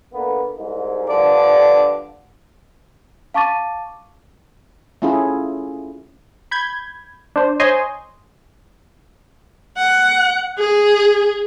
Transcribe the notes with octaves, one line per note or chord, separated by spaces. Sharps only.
D3 A#3 B3
C2 G#2
G2 D3 F3 D5
F5 A5 C#6 D6 A6 D#7
A3 C#4 E4 F4 G#4
B5 G6 G#6
D4 C5
C5 C#5 D#5 G#5 C6
F#5
G#4